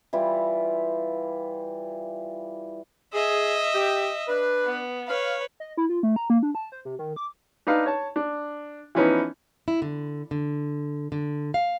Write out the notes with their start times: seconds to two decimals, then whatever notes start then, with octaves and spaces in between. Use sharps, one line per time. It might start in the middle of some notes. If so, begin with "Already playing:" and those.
0.13 E3 G3 E4 F4
3.14 G#4 D#5 E5
3.75 G4
4.28 D4 B4
4.65 B3
5.08 B4 C#5 F5
5.60 D#5
5.77 E4
5.89 F4
6.03 A3
6.16 A#5
6.30 A#3
6.43 D4
6.55 A5
6.72 C5
6.85 C3
6.99 D#3
7.16 D6
7.67 D4 D#4 B4 F5
7.86 C#5 A5
8.16 D4
8.95 E3 F3 B3 C#4 D#4 E4
9.68 E4
9.82 D3
10.31 D3
11.12 D3
11.54 F5